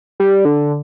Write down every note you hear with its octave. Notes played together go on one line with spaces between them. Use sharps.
G3
D3